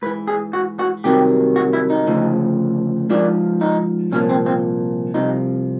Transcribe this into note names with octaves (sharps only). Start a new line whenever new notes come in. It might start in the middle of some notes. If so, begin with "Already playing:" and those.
G#2 E3 B4
G#4
F#4
F#4
C2 C3 D#3 F#3 G4
F#4
E4
D#4
D2 C#3 F3
G#2 F3 D4
D#4
C2 A#2 F3 C#4
C4
C4
C2 C3 F3 D#4